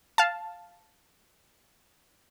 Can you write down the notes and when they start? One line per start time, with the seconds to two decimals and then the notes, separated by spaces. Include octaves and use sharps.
0.18 F5 A5